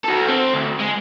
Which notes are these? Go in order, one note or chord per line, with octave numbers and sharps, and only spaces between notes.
F#4 A4
C4
D2
G#3